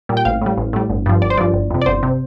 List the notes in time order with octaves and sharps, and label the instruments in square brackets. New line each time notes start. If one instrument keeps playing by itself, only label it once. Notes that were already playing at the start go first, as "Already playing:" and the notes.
[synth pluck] A#2 G3
G5
A1 F5
A2 G3
A1
A2 G3
G1
G2 F3
G1 D5
C5
G2 F3 D5
G1
F2 C3
D5
G1 C5
C3